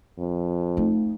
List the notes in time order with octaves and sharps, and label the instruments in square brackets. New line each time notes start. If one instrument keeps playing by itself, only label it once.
[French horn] F2
[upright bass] A3 D#4